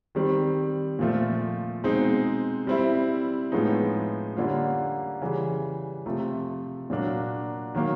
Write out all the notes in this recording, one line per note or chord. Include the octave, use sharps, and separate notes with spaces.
D#3 G3 C4
A#2 F3 A3
B2 G#3 C4 D#4
G3 C4 E4
A2 F3 G#3 B3 D#4
D3 G3 A#3 C#4 F4
C#3 E3 G3
C3 F3 A3
A#2 F#3 A#3 D4 F#4
D#3 F#3 A#3